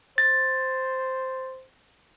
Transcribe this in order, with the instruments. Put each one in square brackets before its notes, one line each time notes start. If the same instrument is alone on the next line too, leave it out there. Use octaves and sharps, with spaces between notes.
[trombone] C5 [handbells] A6